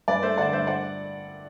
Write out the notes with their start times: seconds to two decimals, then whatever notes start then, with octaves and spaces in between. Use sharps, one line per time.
0.08 G2 B4 D5
0.23 A3 C5 E5
0.38 D3 D5 F#5
0.53 G2 C5 E5
0.67 D5 F#5